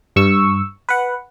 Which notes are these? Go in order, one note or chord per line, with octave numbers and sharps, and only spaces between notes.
G2 C#6 E6
B4 F#5